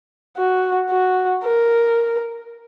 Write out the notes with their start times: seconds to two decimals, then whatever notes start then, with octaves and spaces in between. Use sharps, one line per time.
0.38 F#4
0.91 F#4
1.44 A#4